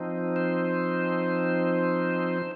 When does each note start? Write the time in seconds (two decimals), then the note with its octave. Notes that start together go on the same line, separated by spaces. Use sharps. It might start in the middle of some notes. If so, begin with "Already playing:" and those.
Already playing: F3 C4 D#4
0.36 C5